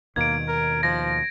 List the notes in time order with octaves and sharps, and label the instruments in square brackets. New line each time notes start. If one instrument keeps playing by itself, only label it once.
[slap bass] D#2 B2 D#3 [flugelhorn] A#3 [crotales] G#6 D7
[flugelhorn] A#4
[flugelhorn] F3 [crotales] A#6